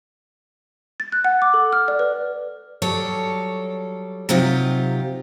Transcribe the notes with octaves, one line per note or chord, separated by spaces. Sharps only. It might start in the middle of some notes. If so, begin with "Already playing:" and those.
A6
F#6
F#5
D6
A4
F6
D5
B4
F#3 G3 A4 C#5
C3 F#3 D#4 F4 G4